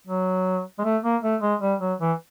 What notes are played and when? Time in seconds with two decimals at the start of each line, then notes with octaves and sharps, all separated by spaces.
0.07 F#3
0.79 G#3
0.84 A3
1.03 A#3
1.23 A3
1.42 G#3
1.61 G3
1.80 F#3
1.99 E3